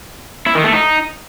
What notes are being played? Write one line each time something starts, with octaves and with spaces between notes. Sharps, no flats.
E4
D#3
A3
D#4